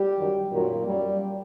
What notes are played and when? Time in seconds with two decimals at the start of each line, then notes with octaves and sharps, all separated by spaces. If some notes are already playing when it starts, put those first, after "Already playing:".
Already playing: G3 G4
0.17 F#2 D#3 F#3
0.51 F#2 A#2 D#3 F#3 A#3
0.86 F#2 F#3 G3